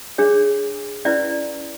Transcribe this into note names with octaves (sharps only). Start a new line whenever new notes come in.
D4 G#4 C#5
C#4 E4 B4 D5